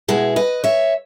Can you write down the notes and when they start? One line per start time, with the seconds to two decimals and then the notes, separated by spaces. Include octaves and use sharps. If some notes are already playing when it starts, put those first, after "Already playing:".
0.08 B2 G#3 B3 E4 G#4
0.36 B4 D#5
0.64 C#5 E5